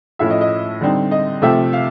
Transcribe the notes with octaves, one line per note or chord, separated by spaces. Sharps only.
A2 F3 A3 C#4 E4 E5
D#5
D#5
D3 G3 C4 D#4
D#5
C3 F3 A3 C4 E5
F5